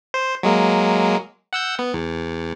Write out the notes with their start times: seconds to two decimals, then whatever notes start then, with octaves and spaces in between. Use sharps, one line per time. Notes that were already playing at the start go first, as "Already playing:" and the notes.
0.14 C5
0.43 F#3 G#3 A#3
1.53 F#5 E6 G6
1.79 B3
1.94 E2